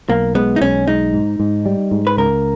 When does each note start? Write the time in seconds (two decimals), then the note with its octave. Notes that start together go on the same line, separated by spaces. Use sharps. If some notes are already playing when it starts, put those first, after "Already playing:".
0.09 B1 A#3
0.35 G#3 B3
0.56 D#4
0.61 B1 C#4
0.87 G#3 D#4
1.13 G#2
1.40 G#2
1.66 G3
1.91 G#2
2.07 B4
2.18 C#2 A#4